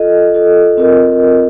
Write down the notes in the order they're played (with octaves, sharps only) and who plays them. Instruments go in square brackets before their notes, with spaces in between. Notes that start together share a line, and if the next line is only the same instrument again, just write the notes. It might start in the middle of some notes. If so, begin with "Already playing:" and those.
Already playing: [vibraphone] F4 A4 D#5
F4 A4 D#5
C4 F4 A#4 D#5